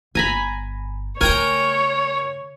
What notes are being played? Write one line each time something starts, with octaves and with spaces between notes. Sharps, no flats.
G1 G#5 A#5 B5
C#3 A3 A#4 C#5 G5 G#5 A#5